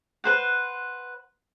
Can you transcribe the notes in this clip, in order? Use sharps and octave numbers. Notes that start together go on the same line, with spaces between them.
B4 C5 F#5